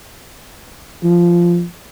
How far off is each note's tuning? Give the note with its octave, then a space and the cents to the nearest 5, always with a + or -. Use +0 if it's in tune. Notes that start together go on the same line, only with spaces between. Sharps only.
F3 -10